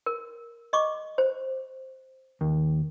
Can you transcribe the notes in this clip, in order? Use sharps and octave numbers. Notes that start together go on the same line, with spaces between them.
A#4
D#5 C#6 D6
C5
D#2